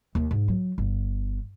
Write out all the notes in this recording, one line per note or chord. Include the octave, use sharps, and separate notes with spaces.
D#2 D#3
G#2
F#3
G1